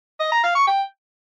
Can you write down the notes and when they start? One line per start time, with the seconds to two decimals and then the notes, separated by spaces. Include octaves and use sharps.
0.20 D#5
0.32 A#5
0.44 F5
0.55 C#6
0.67 G5